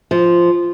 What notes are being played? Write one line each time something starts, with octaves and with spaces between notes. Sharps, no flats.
F3